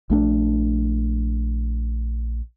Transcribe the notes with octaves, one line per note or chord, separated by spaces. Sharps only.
A#1 A3 D4